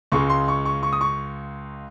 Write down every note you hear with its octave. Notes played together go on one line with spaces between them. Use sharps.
C#2 C#3 G#3 C#6
C6
C#6
C#6
C#6
D#6
C#6